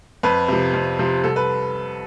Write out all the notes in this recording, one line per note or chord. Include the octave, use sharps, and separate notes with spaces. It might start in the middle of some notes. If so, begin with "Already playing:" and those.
F2 B4
C3 F3
F2
C3 F3
C2 A4
B4